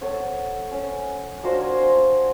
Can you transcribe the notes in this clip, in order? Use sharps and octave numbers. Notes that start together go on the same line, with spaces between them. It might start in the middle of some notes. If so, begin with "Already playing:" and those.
A4 C#5 F#5
C#4
A#3 D4 F#4 C5
G#5
C6